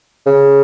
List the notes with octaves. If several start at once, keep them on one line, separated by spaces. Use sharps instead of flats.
C#3